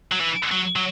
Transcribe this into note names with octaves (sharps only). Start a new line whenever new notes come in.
F#3
E3
F#3
F#3